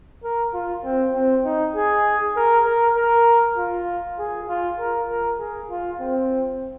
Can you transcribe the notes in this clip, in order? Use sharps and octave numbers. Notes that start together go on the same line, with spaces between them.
A#4
F4
C4
C4
D#4
G#4
A#4
A#4
A#4
F4
G#4
F4
A#4
A#4
G#4
F4
C4